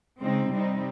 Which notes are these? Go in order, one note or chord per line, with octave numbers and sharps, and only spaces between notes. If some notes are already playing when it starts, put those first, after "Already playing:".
C#3 G#3 C4 D#4
C3 G3 C4 D#4